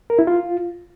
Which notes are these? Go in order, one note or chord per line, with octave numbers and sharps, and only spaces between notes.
A#4
E4
F4